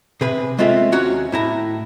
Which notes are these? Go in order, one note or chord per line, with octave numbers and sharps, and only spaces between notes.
C3 G#4 B4 B5
G#3 A3 C4 C#4 F4 E5
D#2 C#4 F#4 C#5 A#5
A2 E4 A#5